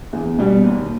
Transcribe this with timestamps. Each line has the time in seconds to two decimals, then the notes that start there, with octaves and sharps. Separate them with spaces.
0.13 E2
0.38 B2 G3
0.64 D#2